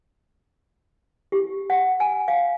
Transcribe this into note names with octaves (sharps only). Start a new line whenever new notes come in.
G4
F#5
G#5
F5